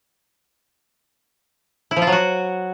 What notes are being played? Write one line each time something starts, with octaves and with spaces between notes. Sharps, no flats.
E4
F3
F4
F#3
F#4